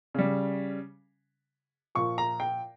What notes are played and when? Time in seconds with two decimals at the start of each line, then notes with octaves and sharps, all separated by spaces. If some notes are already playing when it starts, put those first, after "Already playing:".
0.15 C#3 G3
1.95 A#2 F3 C#6
2.18 A#5
2.40 G5